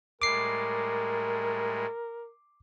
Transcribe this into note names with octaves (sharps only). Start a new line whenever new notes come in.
A2 G3 G#3 A#4 D6 C7